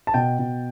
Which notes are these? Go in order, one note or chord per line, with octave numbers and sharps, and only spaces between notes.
A5
B2 G5
B2